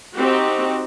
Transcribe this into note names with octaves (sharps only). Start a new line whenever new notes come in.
C4 D#4 F#4 G4